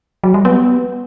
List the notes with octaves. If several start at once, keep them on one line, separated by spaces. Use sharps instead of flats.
F#3
G3
B3